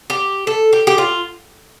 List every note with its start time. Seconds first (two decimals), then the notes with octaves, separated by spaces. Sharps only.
0.10 G4
0.47 A4
0.73 G4
0.87 G4
0.98 F4